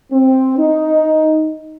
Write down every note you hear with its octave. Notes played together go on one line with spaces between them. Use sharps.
C4
D#4